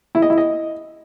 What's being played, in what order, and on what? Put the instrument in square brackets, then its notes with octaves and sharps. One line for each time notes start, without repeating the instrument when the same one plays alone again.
[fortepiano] E4
D#5
E4
D#5